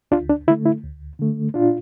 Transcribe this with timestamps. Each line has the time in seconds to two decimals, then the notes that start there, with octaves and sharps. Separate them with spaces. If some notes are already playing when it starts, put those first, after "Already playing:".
0.11 D2 D4 F4
0.30 D4
0.48 D3 A3 E4
0.66 E4
0.83 D2
1.19 D3 A3
1.54 A#2 D4 F4